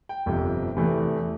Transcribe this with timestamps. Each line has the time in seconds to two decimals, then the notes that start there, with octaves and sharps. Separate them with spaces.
0.09 G5
0.26 G1 F2 C3
0.76 E2 C3 E3 A3